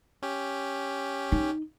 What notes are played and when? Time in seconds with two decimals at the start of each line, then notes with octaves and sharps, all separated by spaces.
0.22 C#4 G4
1.32 D#4